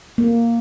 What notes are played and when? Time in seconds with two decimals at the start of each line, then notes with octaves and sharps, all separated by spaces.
0.18 A#3